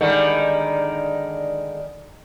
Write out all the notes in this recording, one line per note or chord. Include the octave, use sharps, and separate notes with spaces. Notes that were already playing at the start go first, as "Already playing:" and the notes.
D3 D#3 G3 G#3